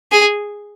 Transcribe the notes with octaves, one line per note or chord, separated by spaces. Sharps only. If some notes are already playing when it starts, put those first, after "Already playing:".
G#4